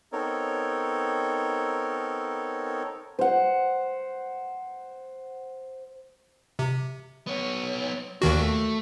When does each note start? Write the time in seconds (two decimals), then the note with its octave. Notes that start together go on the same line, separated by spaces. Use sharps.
0.12 B3 C4 D#4 A4 A#4 C#5
3.19 C5 F#5
6.59 C3
7.27 B3 C#5
8.22 D#2 D#3 D4 F#4
8.39 A3